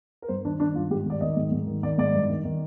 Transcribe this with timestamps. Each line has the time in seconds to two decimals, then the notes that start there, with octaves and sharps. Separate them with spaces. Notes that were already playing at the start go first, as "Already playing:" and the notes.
0.22 A#4
0.28 G2 C5
0.45 D#3 D4
0.60 D#3 D4
0.75 G2 F4
0.90 G#2 G4
1.06 D#3 D5
1.21 D#3 D#5
1.36 G#2
1.52 G#2
1.67 D#3
1.83 D#3 D5
1.98 G#2 D5
2.13 G2
2.30 D#3
2.45 D#3